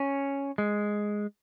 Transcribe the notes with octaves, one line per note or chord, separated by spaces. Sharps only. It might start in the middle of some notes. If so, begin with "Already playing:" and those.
Already playing: C#4
G#3